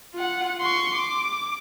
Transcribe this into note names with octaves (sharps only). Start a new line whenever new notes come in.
F4 F#5
C6 C#6
D6